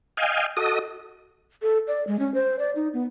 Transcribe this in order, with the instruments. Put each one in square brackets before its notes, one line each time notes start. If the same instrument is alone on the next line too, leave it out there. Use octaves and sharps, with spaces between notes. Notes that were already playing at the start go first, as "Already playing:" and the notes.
[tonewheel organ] D#5 F5 G5 G#5
F#4 A4 D#5 D#6
[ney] A4
D5
G#3
C#4
C5
D5
D#4
B3